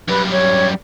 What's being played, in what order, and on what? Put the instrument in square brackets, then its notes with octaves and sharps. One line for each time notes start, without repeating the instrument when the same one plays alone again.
[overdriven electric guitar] F#2 G3 [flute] B4
[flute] C#5